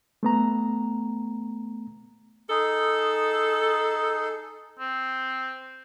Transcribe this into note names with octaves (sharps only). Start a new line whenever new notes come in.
A3 B3 A#5
D#4 G#4 A4
C4